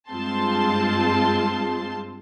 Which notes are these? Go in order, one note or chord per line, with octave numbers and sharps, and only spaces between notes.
G2 G#3 C4 F4 A5 C6